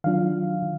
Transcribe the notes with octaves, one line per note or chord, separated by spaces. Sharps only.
D#3 F#3 D4 F4 F5
D#3